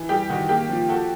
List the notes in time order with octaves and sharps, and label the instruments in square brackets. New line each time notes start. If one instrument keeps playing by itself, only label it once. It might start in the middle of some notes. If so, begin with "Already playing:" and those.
Already playing: [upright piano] E3
[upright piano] G3 [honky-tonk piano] G4
[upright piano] D#3 [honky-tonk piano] F#4
[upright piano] A#3 [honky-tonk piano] G4
[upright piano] F3
[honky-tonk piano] F#4 [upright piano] A4